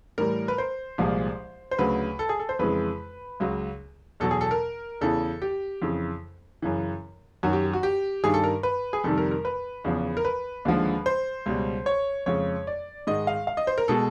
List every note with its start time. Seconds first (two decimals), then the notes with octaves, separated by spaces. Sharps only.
0.18 A2 E3 G3 A#4
0.48 B4
0.58 C5
0.98 C2 A#2 F3 G#3
1.71 C5
1.79 D2 C#3 F#3 B4
2.19 A4
2.29 G#4
2.39 A4
2.49 C5
2.59 F2 C#3 E3 G#3 B4
3.40 C#2 C#3 F#3
4.20 E2 B2 F#3 A4
4.31 G#4
4.41 A4
4.51 A#4
5.01 E2 C#3 E3 A4
5.42 G4
5.82 F2 C#3 E3
6.62 F#2 C#3 E3
7.43 F#2 D#3 F#3 F#4
7.53 G4
7.73 F#4
7.83 G4
8.24 G2 D#3 G3 G#4
8.34 A4
8.44 A#4
8.63 B4
8.93 G#4
9.04 F2 C3 D#3 G3 A4
9.18 A#4
9.31 A#4
9.45 B4
9.84 E2 C#3 F3
10.17 A#4
10.25 B4
10.65 D#2 D3 F3 G#3
11.06 C5
11.46 C#2 B2 G3
11.86 C#5
12.26 F2 C#3 F3 G#3 C#5
12.67 D5
13.07 G#2 D#3 G#3 D#5
13.27 F5
13.47 F5
13.57 D#5
13.67 C5
13.78 A#4
13.88 B2 G#3 A4